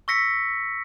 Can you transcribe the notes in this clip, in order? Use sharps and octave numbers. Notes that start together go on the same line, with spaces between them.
C#6 E6 A#6 B6 C#7